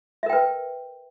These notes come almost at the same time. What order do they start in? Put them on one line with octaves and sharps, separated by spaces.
E5 A#4 G5 B4